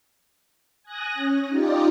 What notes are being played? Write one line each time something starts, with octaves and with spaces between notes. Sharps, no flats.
G#5 D#6 F#6 A#6
C#4
D#4 F4 G4 D5 D#5